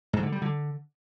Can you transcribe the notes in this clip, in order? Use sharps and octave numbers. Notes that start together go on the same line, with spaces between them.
G#2
D3
G3
D3